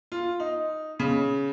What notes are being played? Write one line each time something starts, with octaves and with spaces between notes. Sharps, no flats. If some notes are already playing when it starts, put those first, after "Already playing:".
F4
D#4
C#3